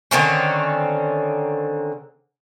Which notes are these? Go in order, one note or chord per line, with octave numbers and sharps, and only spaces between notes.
D3 D#3 C4 C#4